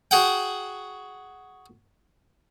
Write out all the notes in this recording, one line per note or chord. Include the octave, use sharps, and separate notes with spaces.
F#4 G#4 F#5 G5